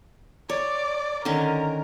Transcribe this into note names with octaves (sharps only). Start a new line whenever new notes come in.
C#5 D5
D3 D#3 C#4 A#4